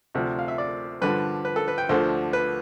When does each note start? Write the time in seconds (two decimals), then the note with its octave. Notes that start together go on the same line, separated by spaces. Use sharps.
0.15 D2 C3 F3
0.39 F5
0.48 E5
0.58 D5
1.02 G2 D3 F3 B4
1.45 B4
1.56 A4
1.68 B4
1.78 G5
1.89 D2 D3 F3 C5
2.33 B4